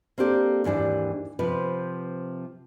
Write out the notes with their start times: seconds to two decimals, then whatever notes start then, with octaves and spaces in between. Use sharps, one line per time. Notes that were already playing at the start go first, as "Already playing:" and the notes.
0.18 A#3 C4 D4 G4 A4
0.64 D#2 G#2 E3 D4 G4
1.39 C3 F3 B4